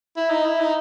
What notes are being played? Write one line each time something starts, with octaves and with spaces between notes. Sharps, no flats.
E4
D#4
E4
D#4